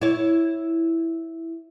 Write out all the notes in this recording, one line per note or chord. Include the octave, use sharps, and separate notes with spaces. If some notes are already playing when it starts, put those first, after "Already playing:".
E4 C#5